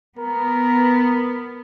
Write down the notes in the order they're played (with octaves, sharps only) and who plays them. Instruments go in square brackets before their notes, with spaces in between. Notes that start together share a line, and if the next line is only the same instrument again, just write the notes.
[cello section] B3 [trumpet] A#4